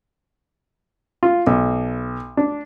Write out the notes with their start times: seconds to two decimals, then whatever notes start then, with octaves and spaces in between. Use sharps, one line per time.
1.23 F4
1.47 B1
2.37 D4